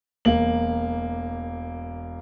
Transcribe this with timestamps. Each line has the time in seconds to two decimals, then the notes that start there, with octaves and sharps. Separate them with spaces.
0.25 E1 A#3 F#7